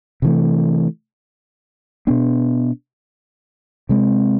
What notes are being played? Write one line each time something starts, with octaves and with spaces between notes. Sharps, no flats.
C3 E3 A3
B2 B3 D4
C3 G#3 C4